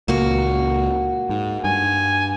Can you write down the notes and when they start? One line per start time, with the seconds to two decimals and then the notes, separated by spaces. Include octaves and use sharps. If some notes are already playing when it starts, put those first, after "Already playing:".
0.08 C#2 A#2 A#3 F#4
1.29 G#2
1.64 G2 G#5